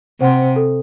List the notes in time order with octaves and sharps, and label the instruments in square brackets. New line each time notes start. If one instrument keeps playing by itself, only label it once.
[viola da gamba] C3 [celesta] C5 F#5 C6
[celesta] A4